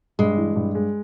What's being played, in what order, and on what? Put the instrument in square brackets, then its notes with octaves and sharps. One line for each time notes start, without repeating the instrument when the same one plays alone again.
[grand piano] G2 [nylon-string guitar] G#3
[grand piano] E3
G2
G#3